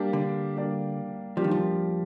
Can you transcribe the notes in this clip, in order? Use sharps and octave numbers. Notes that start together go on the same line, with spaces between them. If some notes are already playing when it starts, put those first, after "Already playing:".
Already playing: G3 A#3 D4 G4 D5
D3
G3 A#3 D4 G4 D5
F3 G3 A#3 D4 G4 D5
D#3
F3